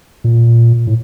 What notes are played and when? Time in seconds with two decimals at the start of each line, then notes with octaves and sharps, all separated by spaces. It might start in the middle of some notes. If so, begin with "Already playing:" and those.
0.24 A#2
0.87 A2